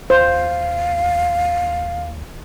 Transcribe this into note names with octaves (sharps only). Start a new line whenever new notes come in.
D#2 C5 F5